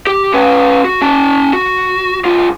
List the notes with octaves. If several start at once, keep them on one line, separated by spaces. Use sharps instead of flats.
G4
C#4 B4
F#4
C#4 A5
F#4
C2 F4